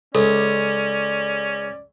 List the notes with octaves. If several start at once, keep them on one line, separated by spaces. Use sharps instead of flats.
C#2 C#4 A4 D5